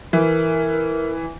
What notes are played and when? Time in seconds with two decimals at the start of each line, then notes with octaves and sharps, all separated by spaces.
0.13 E3 A#4